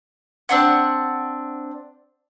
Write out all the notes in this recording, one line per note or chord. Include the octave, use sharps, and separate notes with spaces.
C4 D4 F#5